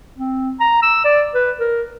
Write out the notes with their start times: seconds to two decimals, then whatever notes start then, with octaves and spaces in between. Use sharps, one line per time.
0.18 C4
0.60 A#5
0.83 E6
1.04 D5
1.35 B4
1.60 A#4